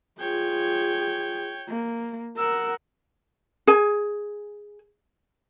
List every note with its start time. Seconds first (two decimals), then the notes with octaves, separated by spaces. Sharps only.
0.20 F4 G#4 C#5 G5
1.68 A#3
2.38 A#4 F#5 E6
3.67 G#4 G#5